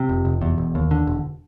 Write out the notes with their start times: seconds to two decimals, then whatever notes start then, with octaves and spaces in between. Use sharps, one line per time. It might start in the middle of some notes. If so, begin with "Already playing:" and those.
Already playing: C3
0.09 F1
0.25 F1
0.42 E2
0.58 E1
0.75 D#2
0.91 D3
1.07 E1